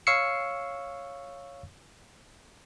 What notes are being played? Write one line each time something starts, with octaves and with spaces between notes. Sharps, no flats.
C#5 F5 C#6 E6 C7 C#7